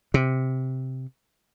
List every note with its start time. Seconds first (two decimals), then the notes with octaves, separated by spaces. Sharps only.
0.14 C3